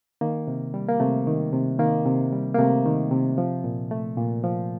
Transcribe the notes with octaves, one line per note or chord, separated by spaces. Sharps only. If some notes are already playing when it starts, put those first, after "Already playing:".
D#3 A#3
C3
G3
A#3
C3 A3
D#3
C3
D#3 A#3
C3
G3
A#3
C3 A3
D#3
C3
F3
A#2
A3
A#2
F3